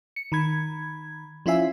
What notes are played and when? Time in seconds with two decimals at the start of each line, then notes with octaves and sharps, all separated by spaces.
0.16 C#7
0.32 D#3 B5 G#6
1.46 F3 C#4 E4 F4 E5 G#5